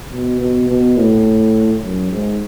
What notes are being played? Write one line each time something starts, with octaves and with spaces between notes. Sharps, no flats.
B2
B2
B2
A2
F#2
G#2